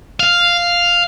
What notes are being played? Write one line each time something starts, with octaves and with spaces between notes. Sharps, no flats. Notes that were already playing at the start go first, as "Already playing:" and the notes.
F5